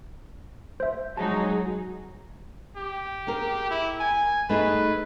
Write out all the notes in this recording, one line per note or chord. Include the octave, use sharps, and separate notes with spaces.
C5 E5
F#3 G#3 D#4 F#4 G#4 A5
G4
A#3 G#4 A#4
E4
G#5
A3 D#4 G#4 B4